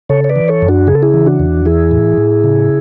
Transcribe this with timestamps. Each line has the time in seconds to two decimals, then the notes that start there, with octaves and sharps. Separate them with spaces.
0.09 C#3 A4 C#5
0.24 C#5
0.29 B4 D5
0.36 E3
0.48 A4 C#5
0.62 F#2
0.68 D4 F#4
0.87 C#3 G#4
0.95 A4
1.03 E4 G#4
1.14 E3
1.26 D4 F#4
1.39 E2
1.65 E3 E4 G#4
1.91 A2
2.18 A2
2.44 C#3